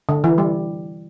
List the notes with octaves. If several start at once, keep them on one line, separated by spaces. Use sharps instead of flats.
D3
E3
G3